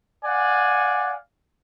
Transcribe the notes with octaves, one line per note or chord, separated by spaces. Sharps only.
D5 F5 F#5 G#5